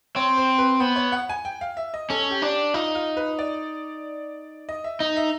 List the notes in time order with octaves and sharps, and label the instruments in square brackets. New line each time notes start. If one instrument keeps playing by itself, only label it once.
[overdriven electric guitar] C4 [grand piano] C#5
[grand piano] C5
B4
[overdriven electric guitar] B3 [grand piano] C5
[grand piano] C#5
F#5
G#5
G5
F5
E5
D#5
[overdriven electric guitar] C#4 [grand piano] A4
[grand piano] G4
[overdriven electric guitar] D4
[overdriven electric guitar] D#4 [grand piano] F4
[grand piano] F4
B4
D5
D#5
E5
[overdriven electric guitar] D#4 [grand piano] D#5
[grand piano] E5